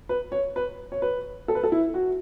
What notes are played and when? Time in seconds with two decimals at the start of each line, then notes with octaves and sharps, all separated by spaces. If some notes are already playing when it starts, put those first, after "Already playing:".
0.09 B4
0.32 C#5
0.56 B4
0.92 C#5
1.02 B4
1.48 A4
1.55 B4
1.63 A4
1.72 E4
1.94 F#4